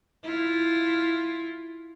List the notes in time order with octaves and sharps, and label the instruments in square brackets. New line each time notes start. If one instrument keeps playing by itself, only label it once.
[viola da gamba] E4 F4